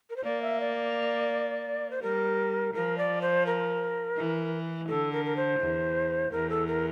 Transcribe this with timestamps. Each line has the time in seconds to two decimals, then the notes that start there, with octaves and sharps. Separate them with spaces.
0.10 A#4
0.16 C5
0.24 A#3 D5
0.42 E5
0.60 D5
1.91 C5
2.02 G3 A#4
2.74 F3 A#4
2.98 D5
3.22 C5
3.46 A#4
4.17 E3
4.88 D3 A4
5.13 A#4
5.25 A#4
5.36 C5
5.60 E2
6.31 E2 A#4
6.50 A4
6.67 A#4